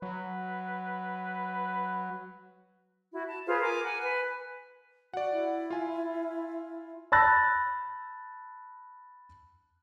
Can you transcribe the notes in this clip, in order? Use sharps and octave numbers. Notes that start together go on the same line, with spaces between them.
F#3 B4
E4 F#4
A5
F4 G#4 B4 C5
A#4 G#5 D6
F#5 G#5
B4 G#5
F#4 D5 F#5
E4
F4 G#5
A5 B5 E6 F#6 A6 A#6